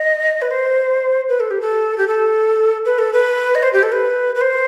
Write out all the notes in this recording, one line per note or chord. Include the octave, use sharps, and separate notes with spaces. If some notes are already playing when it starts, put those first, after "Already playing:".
Already playing: D#5
B4
C5
B4
A4
G4
A4
G4
A4
B4
A4
B4
D#5
C5
G4
A4
B4
B4
C5